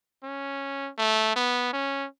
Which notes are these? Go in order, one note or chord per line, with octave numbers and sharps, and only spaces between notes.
C#4
A3
B3
C#4